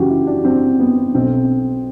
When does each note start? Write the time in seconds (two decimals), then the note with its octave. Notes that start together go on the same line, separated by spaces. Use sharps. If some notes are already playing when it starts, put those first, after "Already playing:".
Already playing: F#1 F#2 E3 F#4 G4
0.10 E4
0.27 D4
0.45 C4
0.80 B3
1.15 B1 B2 C4